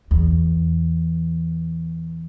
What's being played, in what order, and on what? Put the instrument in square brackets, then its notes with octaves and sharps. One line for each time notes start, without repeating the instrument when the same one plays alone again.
[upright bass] E2